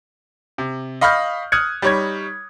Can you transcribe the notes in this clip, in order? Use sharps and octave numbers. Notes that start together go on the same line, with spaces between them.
C3
D#5 F5 B5 C#6 F6 G6
D#6 F6 F#6 G#6 C#7
G3 D#4 C#5 B5 G#6